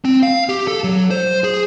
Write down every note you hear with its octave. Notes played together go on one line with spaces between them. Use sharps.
C4
F5
G4
A4
F#3
C5
G#4